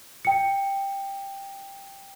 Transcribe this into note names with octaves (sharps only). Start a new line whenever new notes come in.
G5 C#7